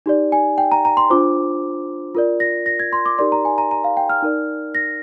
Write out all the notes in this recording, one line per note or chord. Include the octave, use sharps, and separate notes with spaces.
D#4 G4 D5
G#5
G5
A#5
A#5
C6
D4 F4 C5 D6
F4 A#4 D5
A#6
A#6
G#6
C6
D6
D#4 G4 A#4 D5 C6
A#5
G#5
A#5
A#5
F5
G5
F6
D#4 A#4 D5
A#6